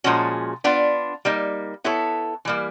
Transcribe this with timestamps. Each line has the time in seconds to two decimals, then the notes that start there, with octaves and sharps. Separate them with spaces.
0.04 A#2 F3 G#3 C#4 F#4
0.64 B3 D4 F4
1.25 G3 A#3 D#4
1.84 B3 E4 A4 C#5
2.45 E3 G3 A#3